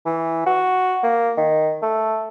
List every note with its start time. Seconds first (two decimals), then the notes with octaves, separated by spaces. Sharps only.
0.06 E3
0.46 F#4
1.03 A#3
1.37 D#3
1.82 A3